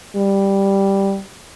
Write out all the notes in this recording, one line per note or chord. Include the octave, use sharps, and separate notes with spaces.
G3